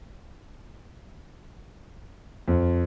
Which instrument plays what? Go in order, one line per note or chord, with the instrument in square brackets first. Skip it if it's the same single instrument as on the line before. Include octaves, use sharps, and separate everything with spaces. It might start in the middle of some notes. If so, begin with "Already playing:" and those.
[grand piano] F2